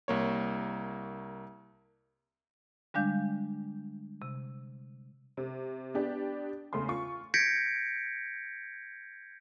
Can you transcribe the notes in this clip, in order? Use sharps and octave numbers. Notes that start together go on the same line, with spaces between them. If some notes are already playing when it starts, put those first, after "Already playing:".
C2 A#3 C#5
D3 G3 G#3 D4 F5 G6
C3
C3
B3 D4 G4
E2 C#3 A3 C#4 C6
F4 C#6
G6 G#6 A#6 B6 C#7 D7